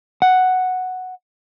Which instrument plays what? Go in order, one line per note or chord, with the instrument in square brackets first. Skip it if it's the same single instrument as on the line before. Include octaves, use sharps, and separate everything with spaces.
[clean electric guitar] F#5